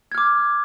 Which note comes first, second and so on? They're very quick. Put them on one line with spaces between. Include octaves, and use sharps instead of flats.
G#6 F6 D6